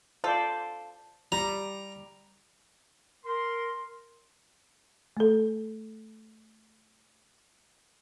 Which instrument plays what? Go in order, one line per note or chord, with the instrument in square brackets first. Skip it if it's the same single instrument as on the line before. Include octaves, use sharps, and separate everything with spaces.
[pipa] F4 A4 [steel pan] C5 D5
[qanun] G3 [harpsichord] A#5
[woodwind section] A#4 C6
[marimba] A3 A4